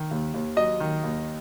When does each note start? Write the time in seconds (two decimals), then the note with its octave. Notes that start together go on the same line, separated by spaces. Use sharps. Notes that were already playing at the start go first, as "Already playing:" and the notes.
Already playing: D#3
0.11 D#2
0.34 D#2
0.56 F#3 D#5
0.80 D#3
1.04 D#2